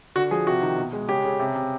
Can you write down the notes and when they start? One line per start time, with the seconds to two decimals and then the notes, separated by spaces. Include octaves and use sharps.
0.15 D3 F#4
0.31 F3 G#4
0.47 C3 F#4
0.62 D#3
0.78 B2
0.93 G#3
1.09 C#3 G4
1.24 C#3
1.39 C3
1.56 C3